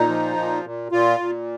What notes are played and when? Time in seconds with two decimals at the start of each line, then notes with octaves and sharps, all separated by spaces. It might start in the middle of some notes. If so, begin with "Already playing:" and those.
Already playing: A#2 D#4
0.08 F3
0.37 A#2
0.65 A#2
0.92 A#2 F4
1.20 A#2